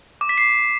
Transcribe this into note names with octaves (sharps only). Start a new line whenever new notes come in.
D6
B6
C7